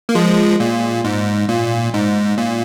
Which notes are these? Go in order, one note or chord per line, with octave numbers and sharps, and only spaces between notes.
A#3
F3 G#3
A#2
G#2
A#2
G#2
A#2